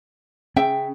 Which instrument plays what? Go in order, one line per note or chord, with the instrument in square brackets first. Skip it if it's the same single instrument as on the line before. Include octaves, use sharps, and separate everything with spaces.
[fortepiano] C#3 [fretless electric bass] C#4 [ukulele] E5 G5